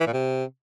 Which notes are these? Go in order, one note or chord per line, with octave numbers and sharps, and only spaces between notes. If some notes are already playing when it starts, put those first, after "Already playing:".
E3
A#2
C3